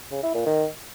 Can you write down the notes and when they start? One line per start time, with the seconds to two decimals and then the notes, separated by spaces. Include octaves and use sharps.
0.11 C#3
0.23 E4
0.34 A#2
0.46 D#3